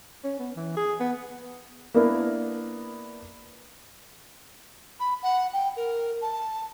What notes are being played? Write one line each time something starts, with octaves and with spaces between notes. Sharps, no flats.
C#4
B3
E3
G#4
B3
A#3 B3 D4 E4 A#4
B5
F#5
G5
A#4
A5